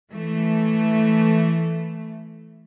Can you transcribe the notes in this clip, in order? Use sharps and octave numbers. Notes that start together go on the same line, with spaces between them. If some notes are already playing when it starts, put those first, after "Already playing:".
E3 A3